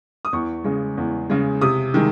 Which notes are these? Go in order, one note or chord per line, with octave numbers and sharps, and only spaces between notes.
D#6
E2 C#6
C#3 G#3
E2
C#3 G#3
C3 D#6
D#3 G#3